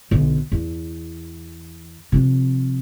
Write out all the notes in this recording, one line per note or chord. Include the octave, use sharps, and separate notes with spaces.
B1 D3
E2
C3 F3